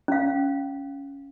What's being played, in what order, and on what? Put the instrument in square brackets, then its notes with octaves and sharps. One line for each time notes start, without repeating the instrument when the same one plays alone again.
[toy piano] C#4 F5